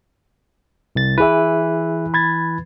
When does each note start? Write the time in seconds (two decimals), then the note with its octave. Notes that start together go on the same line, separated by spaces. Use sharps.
0.96 C2 A6
1.18 E3 E4 G#4 B4 E5
2.14 B5 G#6 A6